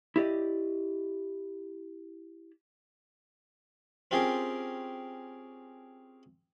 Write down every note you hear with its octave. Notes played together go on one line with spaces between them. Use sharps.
E4 G4 D5 D#5
C4 C#4 F4 G4 G#4 A#4